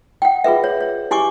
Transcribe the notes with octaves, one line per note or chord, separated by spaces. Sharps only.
F#5 G5
F4 G#4 B4 E5
C#5
C#5
E4 G4 G#5 C#6 D6